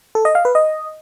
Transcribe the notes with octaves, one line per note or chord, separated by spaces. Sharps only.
A4
D#5
F5
B4
D#5